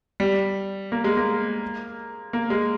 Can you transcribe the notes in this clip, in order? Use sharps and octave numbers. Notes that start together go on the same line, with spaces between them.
G3
A#3
G#3
A#3
A#3
G#3